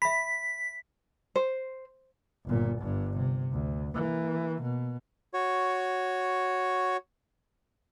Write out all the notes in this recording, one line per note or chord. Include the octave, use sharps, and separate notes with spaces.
E5 B5 B6
C5
G1 A#2
G1 G2
C3
D2
E3 A#3
B2
F#4 C#5